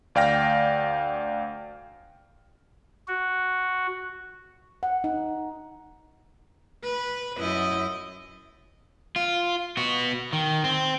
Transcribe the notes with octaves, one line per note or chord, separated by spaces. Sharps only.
D2 D5 F5 G5 F6 A#6
F#4
F#5
D#4
B4
F#2 E4 D#5
F4
B3 F#4
D#3
C4